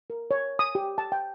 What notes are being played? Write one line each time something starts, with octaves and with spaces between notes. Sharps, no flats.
A#4
C#5
D#6
G4
A5
G5